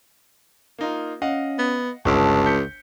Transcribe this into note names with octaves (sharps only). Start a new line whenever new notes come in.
A#3 D#4 F4
C#4 D#5 F5 F#5
B3
G1 C#2 A5 D6
G6 B6 C#7